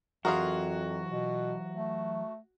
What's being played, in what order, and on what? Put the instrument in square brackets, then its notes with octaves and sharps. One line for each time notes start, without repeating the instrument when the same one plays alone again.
[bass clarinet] F2 [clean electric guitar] E3 F#3 [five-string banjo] F4 G#4 A#4 [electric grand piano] F#4
[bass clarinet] B2
A3